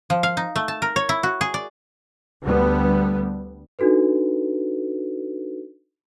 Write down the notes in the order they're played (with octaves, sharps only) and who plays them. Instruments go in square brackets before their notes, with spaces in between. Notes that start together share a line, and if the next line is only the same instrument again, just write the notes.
[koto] F3
F5
D#4
A3
A5
A#4
C#5
E4
F#4
G#4
D5
[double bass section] D2 D3 G3 B3
[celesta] D4 D#4 F#4 A4 B4